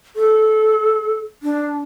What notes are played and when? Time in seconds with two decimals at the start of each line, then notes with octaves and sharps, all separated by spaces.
0.16 A4
1.43 D4